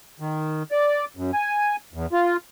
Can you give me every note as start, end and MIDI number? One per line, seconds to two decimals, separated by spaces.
0.20 0.63 51
0.71 1.05 74
1.17 1.31 42
1.33 1.76 80
1.94 2.06 40
2.12 2.37 65